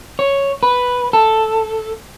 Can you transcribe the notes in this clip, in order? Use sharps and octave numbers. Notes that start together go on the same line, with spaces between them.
C#5
B4
A4